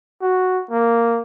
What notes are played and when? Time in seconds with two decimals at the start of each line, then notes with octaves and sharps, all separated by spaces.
0.22 F#4
0.71 A#3